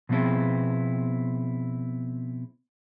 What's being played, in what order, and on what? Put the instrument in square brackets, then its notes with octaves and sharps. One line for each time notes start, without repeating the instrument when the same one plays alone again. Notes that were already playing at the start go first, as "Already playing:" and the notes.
[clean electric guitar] B2 F3 B3 C4 E4 G#4